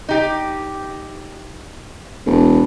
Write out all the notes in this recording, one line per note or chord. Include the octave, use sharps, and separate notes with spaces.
D#4 G4
E1